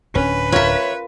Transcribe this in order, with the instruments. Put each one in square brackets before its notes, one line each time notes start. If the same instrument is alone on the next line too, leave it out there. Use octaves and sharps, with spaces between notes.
[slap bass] D1 D4 [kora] C#4 [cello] B4
[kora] F4 A#4 [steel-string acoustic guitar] C#5 E5